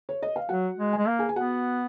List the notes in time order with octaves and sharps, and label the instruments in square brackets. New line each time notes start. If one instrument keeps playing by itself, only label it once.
[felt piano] C#5
D#5
F5
[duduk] F#3 [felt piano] F#4 F#5
[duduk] G#3
[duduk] G#3 [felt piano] G#5
[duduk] A#3
[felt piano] G#4 G#5
G#5
[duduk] B3 [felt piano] F#4 F#5